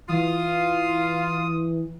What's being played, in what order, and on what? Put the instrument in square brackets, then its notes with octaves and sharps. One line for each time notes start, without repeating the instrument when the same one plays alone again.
[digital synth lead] E3 [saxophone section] F4 [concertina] D#6